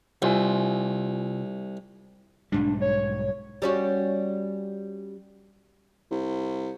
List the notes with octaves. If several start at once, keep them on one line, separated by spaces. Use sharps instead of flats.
C2 C3 F4 G#5
B1 G#2 G3 D4
C#5
G3 C#4 F#4
C2